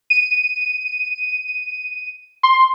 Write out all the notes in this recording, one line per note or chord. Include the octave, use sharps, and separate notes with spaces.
D#7
C6